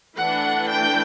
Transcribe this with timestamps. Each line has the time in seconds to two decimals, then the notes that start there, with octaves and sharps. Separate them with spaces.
0.16 E3 A3 D4 F#5
0.70 G5